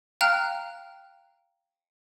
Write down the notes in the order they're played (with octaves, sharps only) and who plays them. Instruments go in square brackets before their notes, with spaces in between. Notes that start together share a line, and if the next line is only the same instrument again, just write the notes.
[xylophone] F5 G5 A#5 F6 F#6